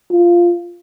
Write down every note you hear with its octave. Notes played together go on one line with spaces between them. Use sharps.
F4